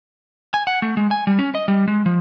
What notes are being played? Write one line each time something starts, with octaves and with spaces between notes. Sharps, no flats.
G#5
F#5
A3
G#3
G#5
G3
C#4
D#5
G3
G#3
F3